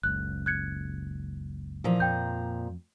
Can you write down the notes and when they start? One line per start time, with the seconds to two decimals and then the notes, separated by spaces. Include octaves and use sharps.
0.03 F#1 C#2 F#6
0.46 F#6 G#6 C#7
1.84 A#2 E3 F3 A#5
2.00 F2 G5 G6